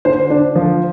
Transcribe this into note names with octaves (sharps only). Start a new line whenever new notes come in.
D3 C5
D3 D4
F3